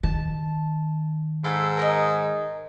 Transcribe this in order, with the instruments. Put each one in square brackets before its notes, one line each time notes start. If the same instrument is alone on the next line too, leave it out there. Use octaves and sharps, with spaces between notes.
[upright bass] D#3 [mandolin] A5
[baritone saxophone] G#2 [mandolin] E4 A4 F5
[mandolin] A#4 C#5 D#5